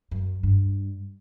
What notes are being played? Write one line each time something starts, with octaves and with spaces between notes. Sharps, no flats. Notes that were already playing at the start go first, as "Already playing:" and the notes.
F#2
G2